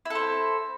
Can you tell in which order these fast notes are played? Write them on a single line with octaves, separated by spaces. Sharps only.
E4 A4 C4